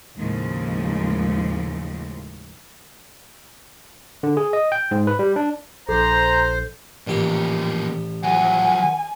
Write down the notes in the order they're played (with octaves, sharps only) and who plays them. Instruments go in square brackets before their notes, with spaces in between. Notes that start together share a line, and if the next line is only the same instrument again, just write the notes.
[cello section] D#2 A2 C#3 F3 G#3
[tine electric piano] D3
G#4
D#5
G5
G#2
B4
G3
D4
[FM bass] A#1 [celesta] A4 [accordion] C5 [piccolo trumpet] A#5
[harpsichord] A1 G4 [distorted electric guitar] F2 A#2
[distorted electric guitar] F3 F#3 [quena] F#5 [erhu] G#5